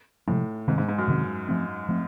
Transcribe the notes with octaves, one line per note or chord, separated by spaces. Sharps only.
A2 C3 F3 G#3
G#2 C3 D#3 G#3 C4
G#2
G#2
F#2
C3 D#3 G#3 C4
F3 A3 C4
F3 A3 C4